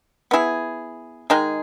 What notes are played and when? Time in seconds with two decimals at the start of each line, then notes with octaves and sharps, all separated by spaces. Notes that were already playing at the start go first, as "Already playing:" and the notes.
0.31 B3 E4 G#4
1.30 D#3 G#3 D#4 G#4